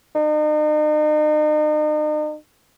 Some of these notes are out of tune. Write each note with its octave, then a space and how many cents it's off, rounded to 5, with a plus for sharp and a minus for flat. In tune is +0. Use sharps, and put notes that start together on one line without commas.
D#4 -40